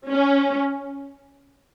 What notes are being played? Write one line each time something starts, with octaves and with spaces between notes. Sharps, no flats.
C#4